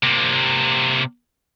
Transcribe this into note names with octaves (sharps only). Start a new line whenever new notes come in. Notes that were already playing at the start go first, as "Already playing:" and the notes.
C3 A#3